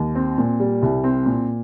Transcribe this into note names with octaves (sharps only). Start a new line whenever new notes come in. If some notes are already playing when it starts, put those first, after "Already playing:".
Already playing: D#2
C4
A#2
G3
C2
C4
A#2